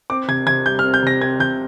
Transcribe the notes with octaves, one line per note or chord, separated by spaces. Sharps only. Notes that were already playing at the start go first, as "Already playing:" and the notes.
C4 D6
C3 G#6
C3 G#6
G3 G6
F6
C4
G6
C3 A#6
C4 G#6
C3 G6